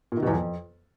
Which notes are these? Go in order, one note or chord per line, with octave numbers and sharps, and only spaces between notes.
A#2
D#3
B2
E2
F2